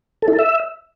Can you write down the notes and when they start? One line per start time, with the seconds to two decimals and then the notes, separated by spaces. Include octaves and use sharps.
0.22 A4
0.28 E4
0.33 A4
0.39 E5